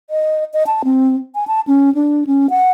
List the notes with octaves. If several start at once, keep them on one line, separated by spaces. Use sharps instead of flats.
D#5
D#5
A5
C4
G#5
A5
C#4
D4
C#4
F#5